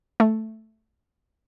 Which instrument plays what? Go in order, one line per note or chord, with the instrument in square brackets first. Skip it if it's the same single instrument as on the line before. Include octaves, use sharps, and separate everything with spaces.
[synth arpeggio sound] A3